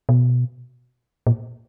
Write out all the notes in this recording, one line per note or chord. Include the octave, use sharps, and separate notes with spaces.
B2
A#2